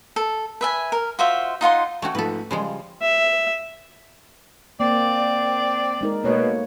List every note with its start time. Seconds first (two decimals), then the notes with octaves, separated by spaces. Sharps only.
0.16 A4
0.61 B4 E5 G#5
0.92 A#4
1.19 F4 F#4 C5 E5
1.61 D#4 F4 F#5 C6
2.02 A3 C#4 F#4 F#5 G5 C#6
2.15 G#2 F3 A3 A4 B4
2.51 C#3 F3 G3 G#3 G#5 C6
3.02 E5
4.80 A#3 C4 D5
6.01 G#3 D#4 A#4
6.24 B2 A3 A#3 C#5